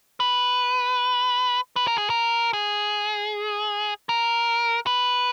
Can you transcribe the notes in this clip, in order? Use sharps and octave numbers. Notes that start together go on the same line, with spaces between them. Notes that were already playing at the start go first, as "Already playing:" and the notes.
B4
B4
A#4
G#4
A#4
G#4
A#4
B4